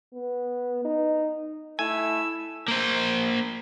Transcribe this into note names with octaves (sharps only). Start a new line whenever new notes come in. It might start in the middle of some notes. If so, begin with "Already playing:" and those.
B3
D#4
A3 E4 G#5 E6
A#3 C5